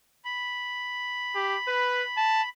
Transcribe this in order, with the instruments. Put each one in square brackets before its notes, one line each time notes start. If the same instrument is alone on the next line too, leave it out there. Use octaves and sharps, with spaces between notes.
[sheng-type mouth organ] B5
[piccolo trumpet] G4
B4
A5